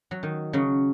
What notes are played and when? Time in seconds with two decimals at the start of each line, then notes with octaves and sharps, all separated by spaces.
0.11 F#3
0.23 D#3
0.53 C#3 F#3